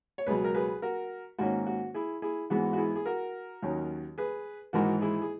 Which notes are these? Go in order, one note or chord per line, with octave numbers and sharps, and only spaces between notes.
C#5
C#2 B2 F#3 G#4 B4
A#4
G#4 B4
F#4 A#4
G#2 D#3 A#3 C#4 F#4
F#4
E4 G#4
E4 G#4
G#2 E3 G#3 B3 F#4
F#4
E4 G#4
G#4
F#4 A#4
D#2 D#3 F#3 C#4
G#4 B4
G#1 G#2 E3 F#4 A#4
E4 G#4
G#4